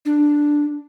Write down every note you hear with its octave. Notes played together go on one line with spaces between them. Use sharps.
D4